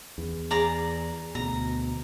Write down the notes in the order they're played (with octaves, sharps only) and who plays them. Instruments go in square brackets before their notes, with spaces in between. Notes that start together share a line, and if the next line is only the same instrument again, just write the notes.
[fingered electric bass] E2
[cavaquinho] G#4 D5 A#5
[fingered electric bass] D2 B2 [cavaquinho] A#5